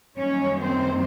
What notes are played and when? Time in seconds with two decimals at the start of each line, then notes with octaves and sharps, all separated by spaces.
0.17 F#2 D#3 G3 A#3 C#4 C#5
0.63 C4 C5